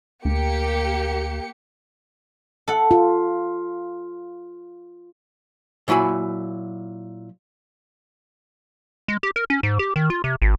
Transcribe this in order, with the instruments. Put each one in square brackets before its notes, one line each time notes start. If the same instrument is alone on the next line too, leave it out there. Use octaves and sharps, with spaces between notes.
[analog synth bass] D2 [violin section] A#3 G4 C#7
[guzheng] A4 F#5
[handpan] F4
[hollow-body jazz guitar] A#2 F#3 E4 G#5 B5
[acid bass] G#3
G4
A#4
C#4
G#2
G4
D#3
F4
C3
G#1